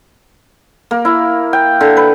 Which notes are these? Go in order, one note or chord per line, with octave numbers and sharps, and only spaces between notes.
A#3
E4
G5
D3
B4